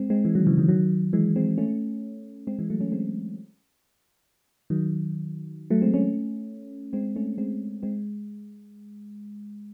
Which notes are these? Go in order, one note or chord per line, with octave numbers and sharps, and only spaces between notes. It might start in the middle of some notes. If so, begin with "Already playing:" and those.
Already playing: G#3 C4
G#3 C4
E3 G#3
D#3 F#3
C#3 E3
D#3 F#3
D#3 F#3
E3 G#3
G#3 C4
A3 C#4
G#3 C4
E3 G#3
F#3 A3
A3 C#4
G#3 C4
D#3 F#3
F#3 A3
G#3 C4
A3 C#4
G#3 C4
A3 C#4
G#3 C4
G#3 C4